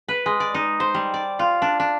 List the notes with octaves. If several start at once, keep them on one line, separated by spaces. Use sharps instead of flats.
B4
G#3
D5
D#4
C5
G3
D5
F4
D4
D4